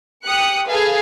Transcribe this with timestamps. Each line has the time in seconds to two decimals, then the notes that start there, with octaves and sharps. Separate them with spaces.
0.23 G4 D#6 F#6 C#7
0.68 G#4 A4 B4 F5 G#5